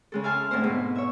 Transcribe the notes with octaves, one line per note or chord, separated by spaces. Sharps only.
C#3 G#3 A4
E5 F5 G#5 A5 C6 F6
D2 A2 C4 E4 C5
G#2 B2
C#5 E5